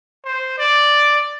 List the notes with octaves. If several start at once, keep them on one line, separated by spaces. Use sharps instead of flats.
C5
D5